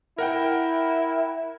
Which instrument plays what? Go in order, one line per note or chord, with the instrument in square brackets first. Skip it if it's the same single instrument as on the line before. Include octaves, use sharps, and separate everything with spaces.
[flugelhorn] E4 [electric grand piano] A#4 F#5 G5